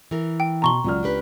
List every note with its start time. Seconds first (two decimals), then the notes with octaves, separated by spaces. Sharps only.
0.11 E3 A#4
0.40 G5 D7
0.62 B2 A5 A#5 C6 C#6 G7
0.84 C#2 F#3 D5 F6
1.03 D4 G4 B4